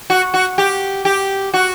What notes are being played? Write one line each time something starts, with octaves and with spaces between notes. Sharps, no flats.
F#4
F#4
G4
G4
F#4